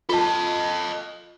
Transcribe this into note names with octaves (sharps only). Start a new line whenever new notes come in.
F4 A4 D#5 A5